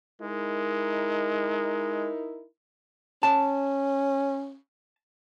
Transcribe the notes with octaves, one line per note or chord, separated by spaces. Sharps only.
G#3 D#4 E4 A#4
C#4 A5